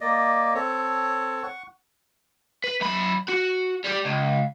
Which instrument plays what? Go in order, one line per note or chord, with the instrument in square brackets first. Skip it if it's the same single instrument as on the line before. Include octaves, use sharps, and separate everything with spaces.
[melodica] A#3 D5 D#5
C4 A4 C#5
F#5 C#6
[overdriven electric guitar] B4
F#2 B5
F#4
G3 G4
C#2